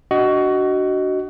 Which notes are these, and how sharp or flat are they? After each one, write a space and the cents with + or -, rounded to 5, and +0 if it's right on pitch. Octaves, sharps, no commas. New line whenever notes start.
D4 +0 F#4 +20 D#5 +0